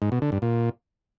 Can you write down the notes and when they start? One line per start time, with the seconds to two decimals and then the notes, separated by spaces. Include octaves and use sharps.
0.02 G#2
0.12 B2
0.22 D3
0.32 G2
0.42 A#2